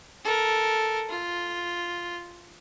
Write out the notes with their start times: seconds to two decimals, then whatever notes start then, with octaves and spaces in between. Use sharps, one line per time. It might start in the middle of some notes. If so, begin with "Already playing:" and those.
0.24 A4 A#4
1.09 F4